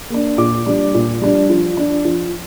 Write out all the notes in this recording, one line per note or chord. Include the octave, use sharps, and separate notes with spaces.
A#3 D4
A#2 D6
G3 D4
A#2
G3 D4
F3
D4
F3